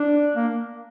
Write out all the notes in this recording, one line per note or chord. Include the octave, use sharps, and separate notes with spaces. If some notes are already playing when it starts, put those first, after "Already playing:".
Already playing: D4
A#3